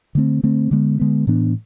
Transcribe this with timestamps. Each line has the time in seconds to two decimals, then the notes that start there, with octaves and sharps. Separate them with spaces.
0.15 D3 A3 C4
0.43 D3 A3 C4
0.71 D3 G#3 B3
1.00 D3 G#3 B3
1.27 A2 E3 B3 D4